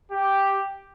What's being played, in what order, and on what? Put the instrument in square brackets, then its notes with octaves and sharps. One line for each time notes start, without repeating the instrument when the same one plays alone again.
[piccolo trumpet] G4